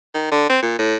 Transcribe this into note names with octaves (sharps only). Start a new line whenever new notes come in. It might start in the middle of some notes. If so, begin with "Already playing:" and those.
D#3
D3
C4
A#2
A2